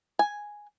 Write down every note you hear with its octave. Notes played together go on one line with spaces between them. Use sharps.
G#5